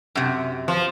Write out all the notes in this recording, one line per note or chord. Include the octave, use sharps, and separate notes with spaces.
F#2 C3
F3